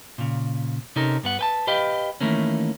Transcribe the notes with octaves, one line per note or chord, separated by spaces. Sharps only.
A#2 C#3
C3 C#4 D#4 A4 A#4
G2 B3 F#5
B4 G5 A5
G4 B4 D#5 F5 G5
D#3 E3 A3 A#3 C#4